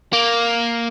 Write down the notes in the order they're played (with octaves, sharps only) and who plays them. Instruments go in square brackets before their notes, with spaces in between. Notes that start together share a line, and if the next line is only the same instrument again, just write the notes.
[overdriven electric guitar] A#3